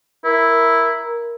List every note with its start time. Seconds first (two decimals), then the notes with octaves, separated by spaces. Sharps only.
0.25 E4 A#4